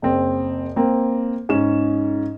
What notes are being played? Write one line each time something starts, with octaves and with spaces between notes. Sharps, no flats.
F#1 C4
A#3 C4
G#2 C#4 E7